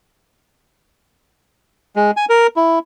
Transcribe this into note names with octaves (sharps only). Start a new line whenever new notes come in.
G#3
G#5
A#4
E4